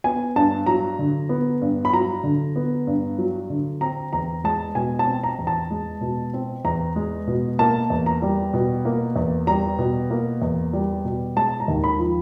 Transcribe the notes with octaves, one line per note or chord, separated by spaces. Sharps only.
B3 G#5
G2 A5
F#3 A#5
D3
B3
G2
B5
F#3 A#5
D3
B3
G2
F#3
D3
C4 A#5
E2 A#5
G#3 A5
B2 G#5
A5
C4
A#5
E2
A5
G#3
B2
C4
E2 A#5
G#3
B2
A#3 A5
E2
A#5
G3
B2
A#3
E2
G3 A#5
B2
A#3
E2
G3
B2
G#3 A5
A#5
D#2
B5
F3